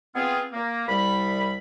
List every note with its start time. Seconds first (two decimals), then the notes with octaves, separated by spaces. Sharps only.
0.15 B3 C4 F4 G#4
0.53 A#3
0.88 C2 G3 B5